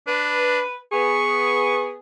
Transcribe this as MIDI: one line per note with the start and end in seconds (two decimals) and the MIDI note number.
0.07 0.60 62
0.07 0.74 71
0.92 1.98 59
0.92 1.98 68
0.92 1.88 85